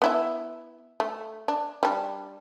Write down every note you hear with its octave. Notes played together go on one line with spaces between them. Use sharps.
B3 E4 E5
A3
D4
G3 D4